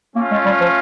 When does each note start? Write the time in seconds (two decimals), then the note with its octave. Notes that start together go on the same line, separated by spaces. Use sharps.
0.16 A3 A#3 C#4 F4
0.31 G#3
0.46 G3
0.61 F3